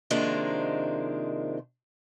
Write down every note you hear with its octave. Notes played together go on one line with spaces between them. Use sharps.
C3 D#3 F3 G#3 A#3 D4